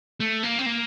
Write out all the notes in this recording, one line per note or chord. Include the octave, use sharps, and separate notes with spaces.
A3
A#3
C4
A#3